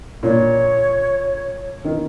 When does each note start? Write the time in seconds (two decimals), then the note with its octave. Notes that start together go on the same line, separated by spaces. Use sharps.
0.23 A#2 C#5
1.85 D#3